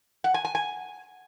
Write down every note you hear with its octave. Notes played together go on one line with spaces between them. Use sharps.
F#5
G#5
G#5
G#5